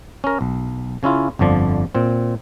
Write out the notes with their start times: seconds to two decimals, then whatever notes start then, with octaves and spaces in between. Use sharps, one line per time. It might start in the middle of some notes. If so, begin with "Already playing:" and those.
0.24 C#4 A#4
0.41 B1
1.03 C#3 C#4 E4 F4
1.39 G1 F2 D3 F3 D5
1.95 A#2 C4